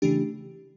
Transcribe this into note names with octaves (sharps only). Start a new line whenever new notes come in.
C#3 E3 A3 D4 G4